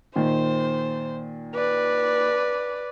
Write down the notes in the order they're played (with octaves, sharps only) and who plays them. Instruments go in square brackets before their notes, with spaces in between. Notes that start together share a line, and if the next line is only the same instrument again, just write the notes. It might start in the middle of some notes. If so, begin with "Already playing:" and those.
[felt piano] A#2 D#3 [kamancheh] C5
[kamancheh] B4 D5